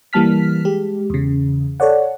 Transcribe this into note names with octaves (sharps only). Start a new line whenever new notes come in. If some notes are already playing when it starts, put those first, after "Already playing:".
E3 G3 A#3 A5 F6 B6
G#3 G4
E2 C#3
A4 C#5 D5 F#5